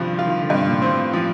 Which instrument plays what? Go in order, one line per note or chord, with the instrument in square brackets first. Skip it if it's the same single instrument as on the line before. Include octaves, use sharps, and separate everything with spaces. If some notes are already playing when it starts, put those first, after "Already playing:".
Already playing: [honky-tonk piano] G2 F3 C4 [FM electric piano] C3 D#3
[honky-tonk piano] F4
[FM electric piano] D#3
D3
[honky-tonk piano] G2 [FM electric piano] C3
[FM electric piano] A#2
[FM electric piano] A2 [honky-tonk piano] C4
[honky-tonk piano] F3